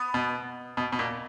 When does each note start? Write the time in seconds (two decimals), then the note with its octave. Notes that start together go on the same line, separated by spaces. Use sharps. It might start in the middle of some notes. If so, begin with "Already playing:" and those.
Already playing: B3
0.14 B2
0.77 B2
0.92 B2
0.99 A#2